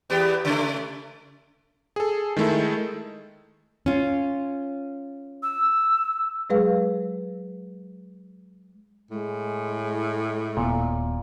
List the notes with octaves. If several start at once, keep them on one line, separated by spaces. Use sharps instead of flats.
E2 B3 G4
C#3 A3
G#4 A4
D#3 G#3 A3 E4 A4
C#4 F4
E6
F#3 G#3 G#4 B4 F5
A2 G#3
D#1 A#2 B3